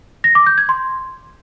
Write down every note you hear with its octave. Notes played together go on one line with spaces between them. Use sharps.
A#6
D6
G6
G#6
C6